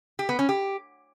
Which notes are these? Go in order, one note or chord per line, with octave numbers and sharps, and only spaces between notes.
G4
B3
C#4
G4